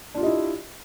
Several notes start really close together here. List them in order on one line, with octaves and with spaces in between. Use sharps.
D4 F4 G4 D#5 E4